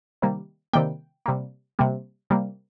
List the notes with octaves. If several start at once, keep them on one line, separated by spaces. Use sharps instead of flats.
C3 D#3 G3 A#3
C3 D#3 G3 A#3 G5
C3 G3 A#3
C3 G3 A#3
C3 G3 A#3